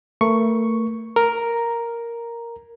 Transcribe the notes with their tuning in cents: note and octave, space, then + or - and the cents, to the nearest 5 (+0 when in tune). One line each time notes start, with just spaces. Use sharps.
A3 +30 A#4 +35 C#6 +0
A#4 +0 A#5 +0